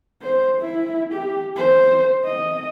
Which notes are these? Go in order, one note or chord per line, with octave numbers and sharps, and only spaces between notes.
C5
E4
G4
C5
D#5